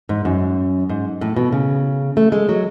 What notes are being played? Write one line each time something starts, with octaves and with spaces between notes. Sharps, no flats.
G#2
F#2
G#2
A2
B2
C#3
A3
G#3
F#3